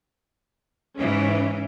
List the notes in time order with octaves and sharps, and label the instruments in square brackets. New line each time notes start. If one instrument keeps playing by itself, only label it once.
[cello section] G#2 C#3 E3 [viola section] C#4